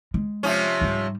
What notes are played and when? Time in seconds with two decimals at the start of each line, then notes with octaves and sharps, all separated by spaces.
0.14 G#3
0.43 C3 F3 C#4
0.81 G#2 G3